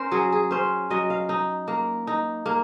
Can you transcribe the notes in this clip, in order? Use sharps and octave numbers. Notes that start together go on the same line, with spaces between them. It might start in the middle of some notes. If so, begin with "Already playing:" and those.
Already playing: C#4 A#4 C5
F#3 G#4
G#4
C#4 C5
F#3 D#5
F5
D#4
A#3
D#4
A#3